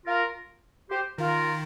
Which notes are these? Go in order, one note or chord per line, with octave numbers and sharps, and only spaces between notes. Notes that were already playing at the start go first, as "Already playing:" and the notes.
F4 A#4
G4 C5
D#3 F4 A#4